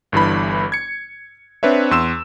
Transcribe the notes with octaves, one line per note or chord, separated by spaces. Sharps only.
G1 G2 E3 B5
G#6 C#7
C4 D4 B4 C#5 E5
E2 C6 E6 E7